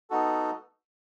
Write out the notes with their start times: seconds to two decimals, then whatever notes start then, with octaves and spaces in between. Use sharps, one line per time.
0.10 B3 D#4 F#4 A4